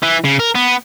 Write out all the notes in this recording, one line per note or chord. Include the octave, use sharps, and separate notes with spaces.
E3
C#3
A#4
B3